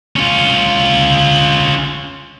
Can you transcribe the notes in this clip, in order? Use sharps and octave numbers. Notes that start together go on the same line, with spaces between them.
C#4 F4